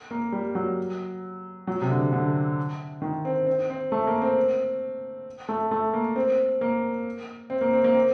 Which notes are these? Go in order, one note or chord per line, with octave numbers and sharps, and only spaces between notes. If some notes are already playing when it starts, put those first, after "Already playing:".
A#3
G3
F#3
F#3
C3
D3
D3
D#3
C4
C4
C4
A3
A#3
C4
A3
A3
A#3
C4
A#3
C4
A#3
C4
A#3
C4